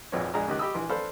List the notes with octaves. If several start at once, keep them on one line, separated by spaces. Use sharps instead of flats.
G#1 F2 A#2 G#3 B4 C#5
A#1 G#3 G#4 D5 A#5
C#2 D#3 G4 D#5 F#6
G4 D#5 B5 D#6 E6
A#1 E3 C6
D4 A4 B4 C5 F5 B5